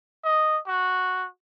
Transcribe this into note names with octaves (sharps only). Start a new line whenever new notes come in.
D#5
F#4